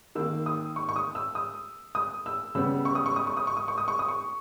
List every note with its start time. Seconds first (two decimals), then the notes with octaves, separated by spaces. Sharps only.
0.15 D#3 A#3 E6
0.46 D#6
0.76 C#6
0.89 C#6
0.96 D#6
1.15 E6
1.35 D#6
1.95 D#6
2.26 E6
2.55 C#3 G3 B3 E6
2.85 C#6
2.95 D#6
3.06 C#6
3.16 D#6
3.27 C#6
3.37 D#6
3.47 C#6
3.57 D#6
3.68 C#6
3.78 D#6
3.88 C#6
3.99 D#6
4.08 C#6